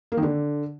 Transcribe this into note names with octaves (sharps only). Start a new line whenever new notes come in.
A#3
D#3
D3